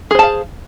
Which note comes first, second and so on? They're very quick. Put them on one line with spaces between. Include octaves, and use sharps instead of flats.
G#4 C5 A5 F5